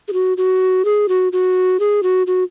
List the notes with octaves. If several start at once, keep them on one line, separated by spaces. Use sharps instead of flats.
G#4
F#4
F#4
G#4
F#4
F#4
G#4
F#4
F#4